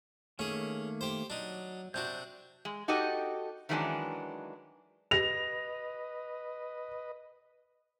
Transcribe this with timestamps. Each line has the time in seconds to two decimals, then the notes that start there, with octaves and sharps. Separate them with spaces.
0.39 D#3 A3 A#3 C#4 G#4
1.01 G4 C5
1.30 F#3 D4 D#4
1.94 C3 D4 F#4 G6
2.65 G#3
2.88 D#4 F#4 G4 A4 D#5
3.69 D#3 E3 F#3 G#3 C#4 D4
5.11 B4 D#5 A#6 F7